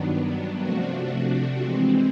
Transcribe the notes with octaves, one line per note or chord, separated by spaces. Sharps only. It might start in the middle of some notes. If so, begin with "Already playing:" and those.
Already playing: G2 D#3 F#3 B3 D4
C3 F3 A3 D4 F#4
E3 G#3 C4